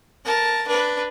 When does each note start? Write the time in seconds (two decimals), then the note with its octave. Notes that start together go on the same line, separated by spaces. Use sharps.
0.25 A#4 A5
0.68 D4 B4